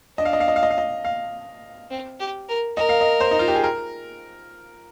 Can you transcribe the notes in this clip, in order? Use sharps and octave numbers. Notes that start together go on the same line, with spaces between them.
D4 D#5
F5
D#5
F5
D#5
F5
D#5
F5
D#5
F5
C4
G4
A#4
A#4 D#5
F5
D#5
C5
D#4
F4
G4
G#4
A#4